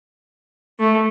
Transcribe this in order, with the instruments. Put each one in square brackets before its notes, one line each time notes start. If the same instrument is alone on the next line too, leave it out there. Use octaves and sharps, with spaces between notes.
[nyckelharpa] A3